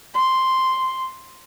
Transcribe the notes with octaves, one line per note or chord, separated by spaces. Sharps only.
C6